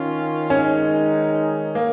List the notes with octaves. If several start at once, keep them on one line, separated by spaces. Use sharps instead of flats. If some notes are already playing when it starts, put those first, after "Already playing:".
Already playing: D#3 C#4 F4
D#3 G#3 C#4 D#4
A#3